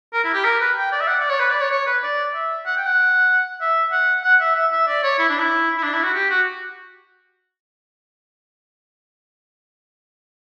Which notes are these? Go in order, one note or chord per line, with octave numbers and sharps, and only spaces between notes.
A#4
E4
G4
A#4
B4
G5
D5
E5
F#5
D5
C#5
B4
D5
C#5
C#5
B4
D5
E5
F#5
G5
F#5
E5
F#5
F#5
E5
E5
E5
D5
C#5
E4
D4
E4
E4
D4
E4
F#4
G4
F#4